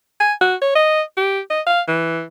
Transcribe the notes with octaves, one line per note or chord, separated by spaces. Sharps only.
G#5
F#4
C#5
D#5
G4
D#5
F5
E3